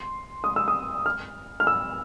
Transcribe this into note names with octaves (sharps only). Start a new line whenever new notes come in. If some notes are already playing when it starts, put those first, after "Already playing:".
Already playing: C6
D#6
E6
D#6
F6
F6
E6